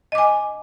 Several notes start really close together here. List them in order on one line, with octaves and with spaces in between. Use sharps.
D#5 D6 G#5